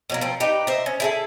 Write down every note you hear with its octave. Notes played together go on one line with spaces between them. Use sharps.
B2 F#3 A#3
F3 C4
D#4 G4 B4
C5 D#5 E5
C#4
E4 G#4 A4